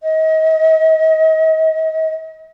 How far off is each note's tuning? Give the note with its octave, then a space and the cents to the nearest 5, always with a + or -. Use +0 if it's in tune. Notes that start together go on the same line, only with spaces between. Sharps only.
D#5 +35